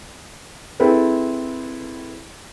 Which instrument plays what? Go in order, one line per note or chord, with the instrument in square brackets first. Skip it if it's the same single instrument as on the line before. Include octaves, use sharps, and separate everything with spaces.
[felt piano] C4 E4 G#4 A4 B4